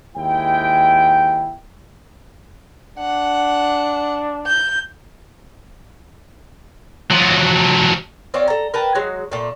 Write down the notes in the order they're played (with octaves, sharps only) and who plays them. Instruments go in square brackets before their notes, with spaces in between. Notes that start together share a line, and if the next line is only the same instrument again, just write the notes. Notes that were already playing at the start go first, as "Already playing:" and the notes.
[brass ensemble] D#2 G#3 E4 G5
[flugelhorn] D4 [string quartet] F#5
[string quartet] G6
[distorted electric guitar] F3 F#3
[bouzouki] C4 C#4 F4 D5
A4 A#5
A#4 B4 G5 A5
F#3 G#3 F#4
A#2 A3